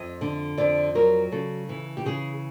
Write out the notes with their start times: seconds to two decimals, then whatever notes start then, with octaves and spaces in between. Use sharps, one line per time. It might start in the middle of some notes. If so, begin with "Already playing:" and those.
Already playing: F2 D#5
0.21 D3
0.57 F2 D5
0.95 F#3 A#4
1.32 C#3 A4
1.69 E3
1.97 G4
2.06 C#3 G#4